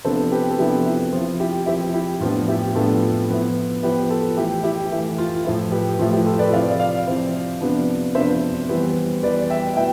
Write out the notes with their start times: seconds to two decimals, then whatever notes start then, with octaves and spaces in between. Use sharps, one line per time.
0.05 C3 F3 B3 D4 A4 C5
0.32 G4 B4
0.51 A4
0.59 C3 F3 B3 D4 E4 G4
0.86 E4
1.12 F3 C4 E4 F4
1.40 E4 G4
1.66 F3 C4 E4 G4
1.94 E4 G4
2.20 A2 F3 B3 D4 F4
2.48 E4 G4
2.74 A2 F3 B3 D4 F4 A4
3.29 F3 B3 E4
3.83 F3 B3 E4 G4 B4
4.10 F4 A4
4.37 E3 A3 E4 G4
4.63 E4 G4
4.91 E3 A3 E4
5.18 F4
5.44 A2 F3 A3 E4
5.72 G4 B4
5.99 A2 F3 A3 E4 F4
6.13 E4 G4
6.26 F4 A4
6.39 B4 D5
6.52 C3 F3 C4 E4 D5 F5
6.79 D5 F5
7.07 C3 F3 C4 E4
7.61 C3 F3 B3 D4
8.15 C3 F3 B3 D4 C5 E5
8.69 E3 G3 B3
9.23 E3 G3 B3 B4 D5
9.50 E5 G5
9.76 B2 B3 E4 E5 G5